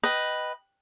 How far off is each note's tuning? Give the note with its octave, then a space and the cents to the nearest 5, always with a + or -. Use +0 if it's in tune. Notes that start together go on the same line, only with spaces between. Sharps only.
B4 +0 D#5 +0 G5 -15